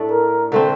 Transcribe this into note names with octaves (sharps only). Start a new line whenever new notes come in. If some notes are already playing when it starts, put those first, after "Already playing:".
Already playing: A2 A3 D4 A4
A#4
D3 A3 C4